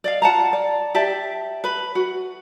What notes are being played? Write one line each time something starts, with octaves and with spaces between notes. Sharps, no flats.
D5 D#5 F5
F4 F#5 A5 A#5
D5
G4 D5 E5 A5
B4 B5
F#4